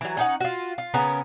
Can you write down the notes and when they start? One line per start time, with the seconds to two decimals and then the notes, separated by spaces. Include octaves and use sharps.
0.01 E3 F#3
0.17 C#4 D#4 F#5
0.41 F4 F#4
0.78 F4
0.94 C#3 B3 C#4 A#4